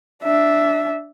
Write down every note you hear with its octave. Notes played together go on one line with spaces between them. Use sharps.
D4 E5